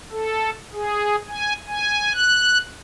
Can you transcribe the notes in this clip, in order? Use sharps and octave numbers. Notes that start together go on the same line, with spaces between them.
A4
G#4
G#5
G#5
F#6